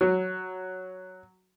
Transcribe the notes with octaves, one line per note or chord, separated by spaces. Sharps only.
F#3